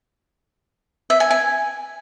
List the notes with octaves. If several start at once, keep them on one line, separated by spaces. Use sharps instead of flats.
E5
G#5
G#5